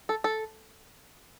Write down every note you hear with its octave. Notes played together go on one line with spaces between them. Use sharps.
A4
A4